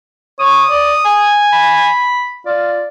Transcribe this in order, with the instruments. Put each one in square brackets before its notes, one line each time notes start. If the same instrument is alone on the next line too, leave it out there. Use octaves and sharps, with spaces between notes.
[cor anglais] C#5 [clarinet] D#6
[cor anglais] D5
G#5
[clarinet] B5
[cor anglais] F4 [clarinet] D5